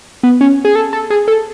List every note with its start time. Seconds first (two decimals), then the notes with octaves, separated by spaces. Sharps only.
0.23 B3
0.41 C#4
0.65 G#4
0.75 A4
0.93 A4
1.10 G#4
1.28 A4